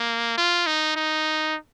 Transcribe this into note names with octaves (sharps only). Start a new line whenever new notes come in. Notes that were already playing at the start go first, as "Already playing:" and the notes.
Already playing: A#3
F4
D#4
D#4